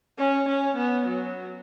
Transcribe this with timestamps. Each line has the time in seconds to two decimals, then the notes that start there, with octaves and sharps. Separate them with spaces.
0.19 C#4
0.48 C#4
0.76 B3
1.06 F#3